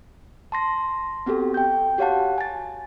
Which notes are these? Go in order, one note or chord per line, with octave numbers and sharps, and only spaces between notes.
A5 C6 A#6
B3 C4 F#4 G4 A4
G5 G6
F#4 G4 C#5 F5 F#5 A5
G#5 A6